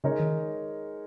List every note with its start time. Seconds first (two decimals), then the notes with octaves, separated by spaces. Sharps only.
0.04 C#3 G#3 D#4 A#4 C#5
0.20 D#3